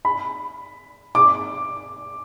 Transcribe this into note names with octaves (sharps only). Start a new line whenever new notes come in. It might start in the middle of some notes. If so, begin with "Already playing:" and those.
B5
D6